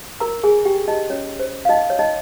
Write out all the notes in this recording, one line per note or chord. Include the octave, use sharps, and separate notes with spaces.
A#4 A#5
G#4 G#5
G4 G5
D#4 D#5
C#4 C#5
C5
F5
D#4 D#5
C#5
D#4 D#5